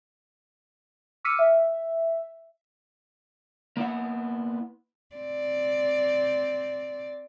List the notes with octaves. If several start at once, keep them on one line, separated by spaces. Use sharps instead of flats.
D6 E6 F6 B6 C#7 D#7
E5
A#3 B3 E4 F#5
C4 D5